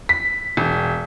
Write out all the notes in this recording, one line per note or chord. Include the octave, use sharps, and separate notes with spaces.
B6
E1